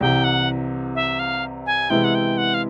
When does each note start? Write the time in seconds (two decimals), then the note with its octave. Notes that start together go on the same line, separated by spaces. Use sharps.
0.01 C2 C3 E3 G5
0.24 F#5
0.95 E5
1.19 F5
1.66 G#5
1.90 C3 E3 G#3 B3 E4 G5
2.04 F#5
2.15 G5
2.38 F#5
2.54 F5